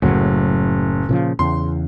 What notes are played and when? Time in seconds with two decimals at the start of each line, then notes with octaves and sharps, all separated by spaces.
0.02 F#1 A2 F#3
1.09 A#2 C#3 F3
1.39 E2 C#3 C6